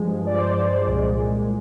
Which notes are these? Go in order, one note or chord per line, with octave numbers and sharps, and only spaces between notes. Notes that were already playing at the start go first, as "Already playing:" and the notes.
Already playing: G2 F3 G#3
D5
C5
C2 A#2 G#3